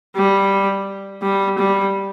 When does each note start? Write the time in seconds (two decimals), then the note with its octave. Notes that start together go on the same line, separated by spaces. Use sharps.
0.16 G3
1.22 G3
1.58 G3